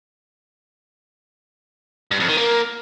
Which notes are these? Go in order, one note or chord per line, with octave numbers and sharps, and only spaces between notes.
G2
F2
D#3
A#3